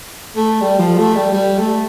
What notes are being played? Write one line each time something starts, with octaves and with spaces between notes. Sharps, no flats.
A3
G3
F3
A3
G3
G3
A3